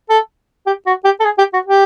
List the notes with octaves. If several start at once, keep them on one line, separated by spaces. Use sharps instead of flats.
A4
G4
F#4
G4
A4
G#4
G4
F#4
G4